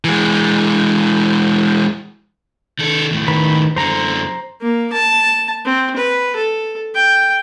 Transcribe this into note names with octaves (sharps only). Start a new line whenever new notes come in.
E3 G#3
D#3 A4
D#2 A2
D#3 B4 B5
F#2 D3 C5 A#5
A#3
A5
C4
B4
A4
G5